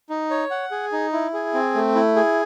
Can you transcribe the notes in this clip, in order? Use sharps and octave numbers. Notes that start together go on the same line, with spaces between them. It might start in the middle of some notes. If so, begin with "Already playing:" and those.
D#4
C#5
F#5
G#4
D#4
E4
G#4
C4
A3
E4
G#4